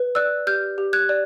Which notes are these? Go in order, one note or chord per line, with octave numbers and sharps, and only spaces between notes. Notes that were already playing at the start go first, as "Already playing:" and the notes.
Already playing: B4
D5 E6 F#6
G4 F6 G6
G4
F#6 G#6
D5